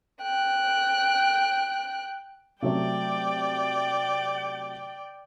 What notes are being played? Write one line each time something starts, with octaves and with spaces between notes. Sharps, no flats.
G5 F#6
C3 F#3 A3 D5 G5